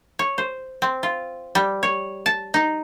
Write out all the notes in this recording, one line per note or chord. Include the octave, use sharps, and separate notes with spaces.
C#5
C5
C4
F4
G3
C#5
A5
D#4